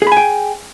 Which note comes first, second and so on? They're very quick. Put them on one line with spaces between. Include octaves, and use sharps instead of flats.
G#4 B5 G#5 G5